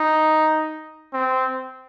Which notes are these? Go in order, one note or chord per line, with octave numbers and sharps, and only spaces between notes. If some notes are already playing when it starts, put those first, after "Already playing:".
Already playing: D#4
C4